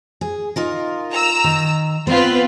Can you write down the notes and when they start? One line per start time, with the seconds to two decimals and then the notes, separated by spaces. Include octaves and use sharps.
0.21 G#4
0.56 D#4 F4 A#4
1.11 A#5 E6
1.44 D#3
2.07 B3 C4 F4 B4